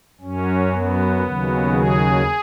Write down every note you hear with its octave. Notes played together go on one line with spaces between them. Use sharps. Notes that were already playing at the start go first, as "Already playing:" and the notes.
F#2 F#3 C#4
B3
D#2 C#3 F#3
G#4